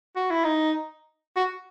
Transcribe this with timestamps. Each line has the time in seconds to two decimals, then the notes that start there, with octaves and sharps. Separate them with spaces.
0.16 F#4
0.30 E4
0.44 D#4
1.36 F#4